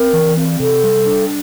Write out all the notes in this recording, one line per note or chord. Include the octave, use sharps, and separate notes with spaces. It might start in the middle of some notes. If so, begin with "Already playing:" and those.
Already playing: C4 A#4
E3
C4
C3 A4
G3
D4